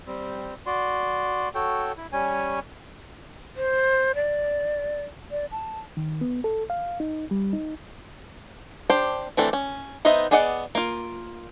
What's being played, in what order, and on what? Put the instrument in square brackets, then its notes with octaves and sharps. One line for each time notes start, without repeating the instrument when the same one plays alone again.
[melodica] G3 C4
F#4 D5 C6
F#4 A4 C#5 G5
E4
G3 C#4 C#5 G#5
[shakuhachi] C5
D5
D5
A5
[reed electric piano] D#3
B3
A4
F5
D#4
G3
D#4
[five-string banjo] D4 G4 C5
E3 A3 C4 D4 A4
C#4
B3 D#4 C5 D#5 E5
B3 G#4 D5 D#5 F#5
A#3 F4